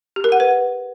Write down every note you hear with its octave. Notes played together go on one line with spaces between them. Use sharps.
G4
A#4
F#5
B4